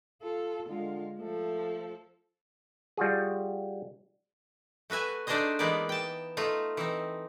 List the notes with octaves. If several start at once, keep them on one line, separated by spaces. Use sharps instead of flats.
F4 A4
D3 G#3 F4
F3 A3 A4
G3 F4 F#4 G#4
A3 F#4 B4 E5 G#5
A3 D4 D#4 G#4 C5 D#5
E3 G#3 A#3 B3 D#4 D5
G5 A5
A3 D#4 F4
E3 C4 D#4